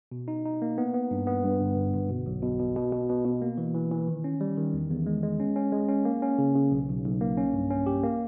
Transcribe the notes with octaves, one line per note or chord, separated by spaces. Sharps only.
B2
D#4
D#4
A#3
B3
B3
G2
B3
G2
G1
G1
G1
B2
B1
B2
B2
B2
B2
B2
B2
A#3
E3
E3
E3
D#3
C#4
G3
D#3
E2
E2
G#3
G#3
C#4
C#4
G#3
C#4
A#3
C#4
C#3
C#3
B1
B1
B1
A#3
C#4
G2
C#4
G4
A#3